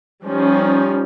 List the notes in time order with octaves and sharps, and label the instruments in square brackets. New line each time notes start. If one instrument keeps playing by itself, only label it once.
[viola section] F3 G3 C#4 D#4